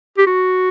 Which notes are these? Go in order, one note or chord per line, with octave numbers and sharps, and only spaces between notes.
G4
F#4